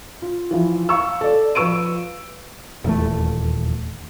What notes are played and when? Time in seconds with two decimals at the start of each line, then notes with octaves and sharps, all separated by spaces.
0.22 F4
0.51 E3 F3 E4
0.89 F5 C#6 E6
1.21 A4 D5
1.55 F3 B4 C#6 E6 D7 D#7
2.84 D#1 E2 A3